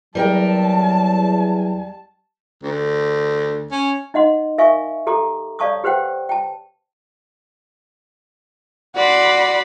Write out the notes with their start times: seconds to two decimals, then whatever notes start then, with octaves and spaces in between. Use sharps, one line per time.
0.15 E2 F#3 G3 A#4 G5 A5
2.63 D2
3.71 C#4
4.14 D#4 D#5 F#5 C6
4.58 A#4 E5 F5 G#5 C#6
5.07 G4 A4 A#5 D6
5.59 C#5 D5 F5 A5 C#6 D#6
5.84 G4 B4 C5 F#5 G5
6.29 G5 A5
8.96 F#4 D5 B5 C6